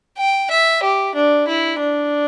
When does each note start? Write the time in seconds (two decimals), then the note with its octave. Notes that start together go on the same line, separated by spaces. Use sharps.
0.18 G5
0.51 E5
0.83 G4
1.15 D4
1.48 E4
1.80 D4